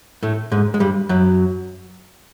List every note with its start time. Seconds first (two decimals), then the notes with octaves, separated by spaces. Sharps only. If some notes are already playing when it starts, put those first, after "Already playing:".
0.23 A2 A3
0.52 G#2 G#3
0.74 G#3
0.80 G2 G3
1.09 F#2 F#3